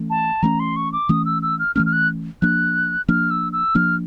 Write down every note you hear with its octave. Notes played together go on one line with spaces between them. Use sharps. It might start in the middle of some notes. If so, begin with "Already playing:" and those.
Already playing: E3 A3 C#4
A5
E3 A3 C#4 A#5
C6
C#6
D6
E3 A3 C#4 D#6
E6
E6
F6
E3 A3 C#4 F6
F6
F#6
F3 A#3 D4 F#6
F3 A#3 D4 F6
E6
E6
F3 A#3 D4 F6